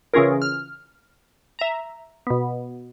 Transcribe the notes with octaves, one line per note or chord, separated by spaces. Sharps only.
C#3 E3 C#4 F4 G#4 A#4
F6
E5 A#5
B2 B3